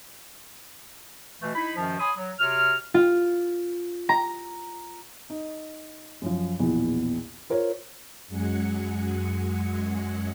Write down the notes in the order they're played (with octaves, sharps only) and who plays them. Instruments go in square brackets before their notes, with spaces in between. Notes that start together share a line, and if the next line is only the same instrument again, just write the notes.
[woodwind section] B2 E3 A3
D#4 E4 B5
F#2 B2 D#3 F3
C#5 G#5 B5 C6 D#6
F#3
C3 F#4 C#5 F6
[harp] F4
A#5
[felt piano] D#4
F#2 F3
A#1 E2 B2
F4 A#4 C5 C#5
[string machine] F#2 F#3 G#3 F#5 G#5 C#7